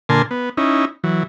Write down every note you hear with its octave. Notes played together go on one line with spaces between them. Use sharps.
A#2 D3 A#4 G#5 A5 C6
B3
C#4 D#4 E4
E3 F#3